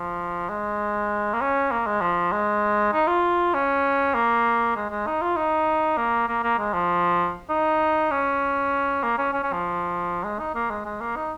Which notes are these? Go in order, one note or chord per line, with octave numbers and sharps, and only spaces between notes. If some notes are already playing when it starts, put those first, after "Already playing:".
Already playing: F3
G#3
A#3
C#4
A#3
G#3
F3
G#3
D#4
F4
C#4
A#3
G#3
G#3
D#4
F4
D#4
A#3
A#3
A#3
G#3
F3
D#4
C#4
A#3
C#4
C#4
C#4
F3
G#3
D#4
A#3
G#3
G#3
A#3
D#4